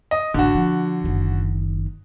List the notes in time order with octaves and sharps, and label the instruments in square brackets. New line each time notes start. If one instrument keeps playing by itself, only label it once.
[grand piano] D#5
[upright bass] A1 [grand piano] D3 F#4
[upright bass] F3
F#1 D#3